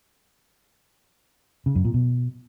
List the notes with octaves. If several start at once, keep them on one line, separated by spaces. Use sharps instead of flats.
C#3
F#2
A#2
B2